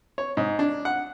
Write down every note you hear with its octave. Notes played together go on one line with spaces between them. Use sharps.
C#5
G#2
D4
F#5